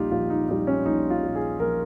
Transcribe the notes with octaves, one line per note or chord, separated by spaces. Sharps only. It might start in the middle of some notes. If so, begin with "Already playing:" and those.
Already playing: A#1 A#2 G3 D#4 F4 G4
A#1 F4
D#4
A#2 G3 D#4
C#4
A#1 D#4
F4
A#2 G3
G#4
A#1 A#4